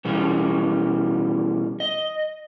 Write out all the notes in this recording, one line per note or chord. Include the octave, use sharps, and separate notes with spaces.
B2 E3 G3 C#4
D#5